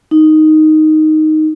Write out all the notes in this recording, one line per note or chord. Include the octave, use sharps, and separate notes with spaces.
D#4